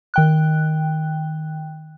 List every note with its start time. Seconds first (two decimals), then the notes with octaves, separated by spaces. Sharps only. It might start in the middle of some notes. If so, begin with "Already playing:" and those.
0.14 D#3 G5 F#6